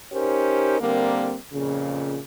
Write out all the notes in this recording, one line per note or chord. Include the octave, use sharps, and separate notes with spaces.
C#4 D#4 G4 A#4 C5
D3 G3 A#3 C4 A#4
F2 A#2 C#3